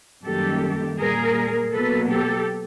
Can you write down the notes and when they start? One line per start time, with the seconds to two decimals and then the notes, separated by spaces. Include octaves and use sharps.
0.24 F#2 D#3 G3 A#3 G4 A4
0.98 A#2 G3 A#3 G#4 A#4
1.73 B2 F#3 A#3 A4 B4
2.10 G4 A4